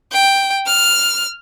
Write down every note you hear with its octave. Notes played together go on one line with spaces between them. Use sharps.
G5
F6